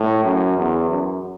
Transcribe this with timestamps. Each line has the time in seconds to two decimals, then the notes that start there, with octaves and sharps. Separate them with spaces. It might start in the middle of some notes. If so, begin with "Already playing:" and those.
Already playing: A2
0.24 F#2
0.58 E2
0.90 F#2